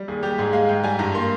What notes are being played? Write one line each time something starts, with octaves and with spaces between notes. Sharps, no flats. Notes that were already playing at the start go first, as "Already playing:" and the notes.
Already playing: G3
D#2 G#4
G3 G4
G#2 G#4
G#3 F5
G#2 G5
G3 G#5
G2 A#5
A#3 C6